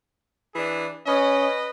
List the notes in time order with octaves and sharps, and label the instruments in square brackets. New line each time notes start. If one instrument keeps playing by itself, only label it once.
[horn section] E3 D4 G#4
[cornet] C#4 [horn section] B4 D#5